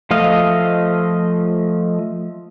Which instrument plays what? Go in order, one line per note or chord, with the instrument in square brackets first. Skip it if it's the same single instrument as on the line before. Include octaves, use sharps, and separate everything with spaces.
[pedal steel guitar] F3 A3 D#5 F5